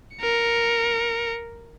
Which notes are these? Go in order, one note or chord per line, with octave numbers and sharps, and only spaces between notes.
A#4 C#7